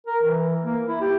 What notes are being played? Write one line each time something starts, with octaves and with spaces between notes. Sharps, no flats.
A#4
E3
A#3
E4
G4